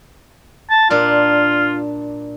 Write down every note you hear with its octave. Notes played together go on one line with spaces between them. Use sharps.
A5
A#2 D4 F4